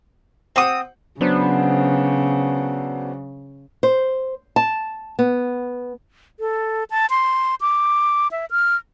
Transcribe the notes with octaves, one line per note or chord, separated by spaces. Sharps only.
C4 C5 F#5 D#6
C#3 F#3 B3 D4 C5
C5
A5
B3
A4
A5
C6
D6
E5
F6